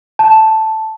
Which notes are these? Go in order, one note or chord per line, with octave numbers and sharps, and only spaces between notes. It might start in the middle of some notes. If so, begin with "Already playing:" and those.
A5